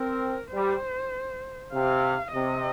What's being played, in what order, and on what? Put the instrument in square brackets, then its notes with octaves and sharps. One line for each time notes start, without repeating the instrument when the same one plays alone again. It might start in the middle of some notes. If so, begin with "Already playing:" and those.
Already playing: [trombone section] C4 [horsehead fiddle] A#4
[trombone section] G3 [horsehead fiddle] C5
[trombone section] C3 [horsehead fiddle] F5
[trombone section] C3 [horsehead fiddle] D#5